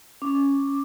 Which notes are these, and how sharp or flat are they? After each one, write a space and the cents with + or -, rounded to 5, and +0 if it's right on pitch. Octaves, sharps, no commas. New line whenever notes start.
C#4 +0 D6 +0